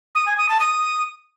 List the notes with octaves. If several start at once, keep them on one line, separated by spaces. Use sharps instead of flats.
D#6
G#5
D#6
A5
D#6